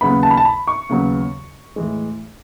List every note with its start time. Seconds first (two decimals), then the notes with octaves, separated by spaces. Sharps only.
0.01 D#2 C#3 F#3 B3 B5
0.23 A5
0.30 B5
0.37 A5
0.45 B5
0.67 C#6
0.89 D#2 C#3 F#3 B3
1.76 A2 E3 G#3